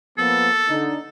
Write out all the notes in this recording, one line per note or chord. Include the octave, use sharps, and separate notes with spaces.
F3 A#3 B3 A4
D3 D#4